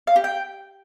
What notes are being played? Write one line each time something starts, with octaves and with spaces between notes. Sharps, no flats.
F5
G4
G5